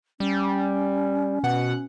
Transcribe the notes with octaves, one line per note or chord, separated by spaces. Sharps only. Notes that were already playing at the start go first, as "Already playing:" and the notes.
G3 C#4
B2 F#5